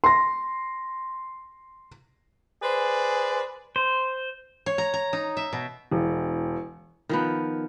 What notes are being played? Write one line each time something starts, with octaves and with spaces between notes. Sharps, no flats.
C6 A#6
G#4 B4 C5 D5
C5
C#5
A#5
A#5
D#4
E5
B2
E1
D#3 F3 B3